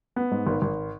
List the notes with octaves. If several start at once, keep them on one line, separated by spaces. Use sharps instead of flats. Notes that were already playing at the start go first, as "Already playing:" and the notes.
B3
G#2
G#1
G#1